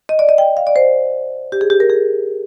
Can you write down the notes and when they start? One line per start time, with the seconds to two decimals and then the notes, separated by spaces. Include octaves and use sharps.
0.09 D#5
0.19 D5
0.29 D#5
0.38 G5
0.57 F5
0.67 D5
0.76 C5
1.52 G4
1.61 G#4
1.70 G4
1.80 A#4
1.90 G#4